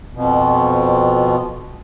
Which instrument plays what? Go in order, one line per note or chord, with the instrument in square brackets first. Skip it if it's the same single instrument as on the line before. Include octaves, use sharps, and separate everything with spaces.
[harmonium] F2 B2